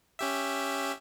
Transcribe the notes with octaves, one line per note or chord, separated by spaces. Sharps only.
C#4 G4 E5